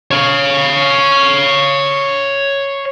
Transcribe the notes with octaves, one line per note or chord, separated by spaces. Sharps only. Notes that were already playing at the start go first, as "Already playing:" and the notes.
C#5 F5